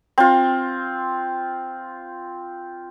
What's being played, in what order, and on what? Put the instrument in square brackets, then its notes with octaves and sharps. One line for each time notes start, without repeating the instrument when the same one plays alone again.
[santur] C4 F4